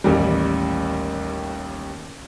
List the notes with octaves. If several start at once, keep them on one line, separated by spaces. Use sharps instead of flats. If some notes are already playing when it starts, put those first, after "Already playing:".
A1 D#2 G3